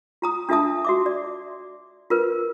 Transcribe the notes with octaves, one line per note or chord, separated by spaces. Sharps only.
F4 A#5 D#6
D4 F4 A4 E5 A5 D#6
F#4 E5 D6
D5
F4 A#4 B4